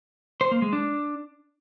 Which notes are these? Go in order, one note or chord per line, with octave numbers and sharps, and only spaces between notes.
C5
A#3
G#3
D4